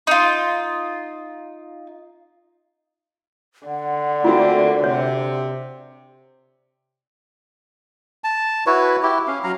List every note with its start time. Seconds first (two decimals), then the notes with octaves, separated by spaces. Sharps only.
0.07 D#4 F4
3.67 D3 F#5
4.24 A3 A#3 C4 F4 F#4
4.84 C3 C#5
8.24 A5
8.66 E4 F#4 B4 C#5
9.03 E4 G4
9.27 C#4 F5
9.44 F#3 F5 A#5